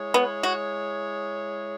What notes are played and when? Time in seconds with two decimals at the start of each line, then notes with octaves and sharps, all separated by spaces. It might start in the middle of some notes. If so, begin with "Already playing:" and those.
Already playing: G#3 E4 G#4 C#5
0.14 B3
0.43 F#4